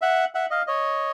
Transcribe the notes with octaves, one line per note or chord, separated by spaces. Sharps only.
E5 F#5
E5 F#5
D#5 F5
C#5 D#5